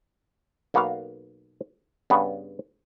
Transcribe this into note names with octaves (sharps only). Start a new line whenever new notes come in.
B1 A#3 B3 F#4 A#4 F5
G2 C#3 B3